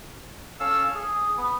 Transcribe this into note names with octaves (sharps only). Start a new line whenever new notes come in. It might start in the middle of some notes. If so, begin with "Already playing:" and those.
C#4 A4 F5 E6
G#4
B3